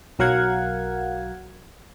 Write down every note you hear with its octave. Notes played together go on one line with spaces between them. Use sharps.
B1 F#3 A#4 F5 F#5 G#6